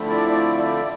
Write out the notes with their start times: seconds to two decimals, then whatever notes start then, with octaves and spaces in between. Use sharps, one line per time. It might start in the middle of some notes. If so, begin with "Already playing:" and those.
Already playing: D3 F3 A3 C4 E4
0.10 D5
0.31 D5
0.59 D5